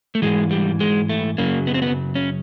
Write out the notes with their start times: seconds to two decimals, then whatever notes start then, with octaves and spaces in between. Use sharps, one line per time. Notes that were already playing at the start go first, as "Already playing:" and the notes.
0.15 A3
0.22 G#2 E3 G#3
0.51 G3
0.80 G#3
1.09 A3
1.38 F#2 C#3 F#3 A#3
1.67 B3
1.74 C4
1.82 B3
2.15 C#4